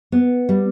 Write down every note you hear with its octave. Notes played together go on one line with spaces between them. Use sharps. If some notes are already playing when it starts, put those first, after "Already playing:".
B3
G3